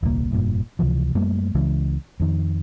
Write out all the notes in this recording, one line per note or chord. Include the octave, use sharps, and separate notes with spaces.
D#1 C2 C3 A#3
F1 G2 A#2
C#2 C3 E3 F3
F#2 G3 A3 A#3
C#2 C#3 E3 G#3
F2 D#3